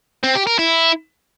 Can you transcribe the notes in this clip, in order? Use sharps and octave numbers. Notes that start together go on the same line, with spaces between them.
C4
G4
A#4
E4